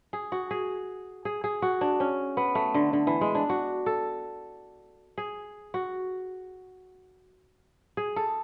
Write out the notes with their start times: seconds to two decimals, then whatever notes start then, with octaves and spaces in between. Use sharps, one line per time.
0.13 G#4
0.32 F#4
0.51 G#4
1.25 G#4
1.44 G#4
1.62 F#4
1.81 D4
2.00 C#4
2.37 B3
2.55 A3
2.74 D3
2.93 D3
3.07 E3
3.21 G#3
3.35 D4
3.50 F#4
3.86 A4
5.18 G#4
5.74 F#4
7.97 G#4
8.16 A4